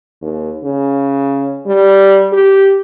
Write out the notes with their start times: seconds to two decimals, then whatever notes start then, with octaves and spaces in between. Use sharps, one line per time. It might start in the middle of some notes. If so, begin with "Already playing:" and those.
0.22 D#2
0.64 C#3
1.66 G3
2.33 G4